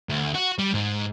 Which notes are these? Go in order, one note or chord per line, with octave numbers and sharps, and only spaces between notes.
D2
F#4
G3
G#2